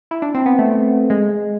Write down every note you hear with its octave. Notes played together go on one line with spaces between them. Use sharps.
E4
D4
C4
B3
A3
G#3